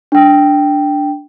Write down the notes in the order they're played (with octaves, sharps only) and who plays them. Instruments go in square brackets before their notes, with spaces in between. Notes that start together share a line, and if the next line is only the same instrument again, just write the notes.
[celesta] D4 G5